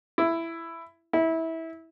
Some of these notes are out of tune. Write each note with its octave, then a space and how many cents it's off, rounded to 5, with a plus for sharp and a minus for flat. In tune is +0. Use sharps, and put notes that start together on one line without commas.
E4 +10
E4 -20